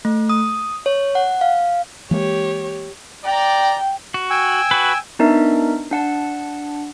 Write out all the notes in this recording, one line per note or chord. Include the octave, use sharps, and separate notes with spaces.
A3
D#6
C#5
F#5
F5
E3 G#3 A#3 G4 C#5
D5 G5 A#5
F#4
G5 G#5 E6
F#4 B4
B3 D4 D#4 A#4 E5
D4 F#5 A5